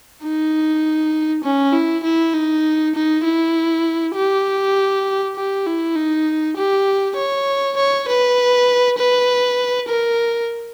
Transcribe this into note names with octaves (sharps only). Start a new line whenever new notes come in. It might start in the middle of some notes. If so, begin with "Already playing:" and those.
D#4
C#4
E4
E4
D#4
D#4
E4
G4
G4
E4
D#4
G4
C#5
C#5
B4
B4
A#4